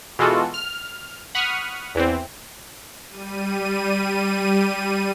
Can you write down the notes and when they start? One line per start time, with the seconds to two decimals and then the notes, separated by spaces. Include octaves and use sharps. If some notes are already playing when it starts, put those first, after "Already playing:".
0.19 B2 E3 G#3 F4 F#4 A4
0.54 F6
1.35 F#5 B5 C#6 D#6 F6
1.95 E2 E3 C4
3.08 G3 D#7